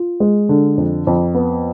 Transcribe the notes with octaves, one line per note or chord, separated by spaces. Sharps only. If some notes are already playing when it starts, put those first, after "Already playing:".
Already playing: F4
G#3
D3
F2
F2
B3